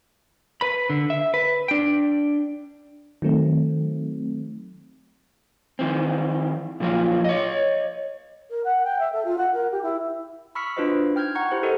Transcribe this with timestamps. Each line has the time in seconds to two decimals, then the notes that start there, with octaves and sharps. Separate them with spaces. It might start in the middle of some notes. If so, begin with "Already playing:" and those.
0.61 B4 B5
0.90 D3
1.10 E5
1.34 B4
1.68 D4 G5
3.22 D#3 F#3 A3 C4
5.79 D#3 E3 C4
6.80 A#2 F3 F#3 A#3
7.24 C#5 D#5
8.50 A#4
8.64 F#5
8.83 G5
8.99 E5
9.12 A4
9.24 F4
9.37 F#5
9.53 A#4
9.71 G4
9.82 E4
10.55 B5 C#6 E6 F6 B6 C#7
10.77 D4 F4 F#4 B4 C5 D#5
11.15 D#4 G5 F6 G6 G#6
11.35 F#5 A#5 C#6 G#6
11.51 E4 G4 C5
11.63 G4 A4 A#4 D#5 F#5